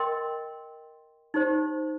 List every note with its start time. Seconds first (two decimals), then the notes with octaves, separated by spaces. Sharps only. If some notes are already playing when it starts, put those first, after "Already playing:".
Already playing: A#4 D#5 G5 C6
1.34 D#4 G4 C5